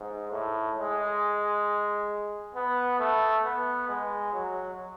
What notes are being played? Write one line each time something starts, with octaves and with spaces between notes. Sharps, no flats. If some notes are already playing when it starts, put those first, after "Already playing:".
Already playing: G#2
A2
G#3
B3
A3
B3
G#3
F#3